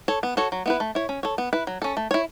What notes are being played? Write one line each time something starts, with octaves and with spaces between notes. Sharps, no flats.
A4 C#5
B3
F#4 A4 C#5
F#3
B3 E4 B4
A3
E4 C#5
C#4
A4 C#5
B3
E4 B4
F#3
C#4 A4
A3
E4 C#5